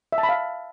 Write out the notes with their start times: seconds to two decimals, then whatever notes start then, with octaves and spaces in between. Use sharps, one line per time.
0.12 E5
0.18 A5
0.23 B5
0.29 F5